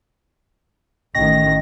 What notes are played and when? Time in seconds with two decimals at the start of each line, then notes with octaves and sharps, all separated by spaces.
1.15 A1 D#3 C#4 D#5 G5 A#6